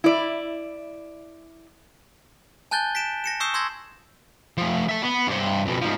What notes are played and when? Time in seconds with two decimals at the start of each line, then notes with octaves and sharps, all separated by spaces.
0.04 E4 D5
2.71 G#5 A5 F#6 G6 A6 G7
2.95 B6 D7 E7
3.24 A#6 C#7 E7
3.40 C#6 D#6 E6 G6 C7 E7
3.54 C6 E6 G6 G#6 A#6
4.58 F3 A3
4.89 E5 A5
5.03 B3
5.27 G2 C5
5.66 F2 B2
5.81 G#2 F3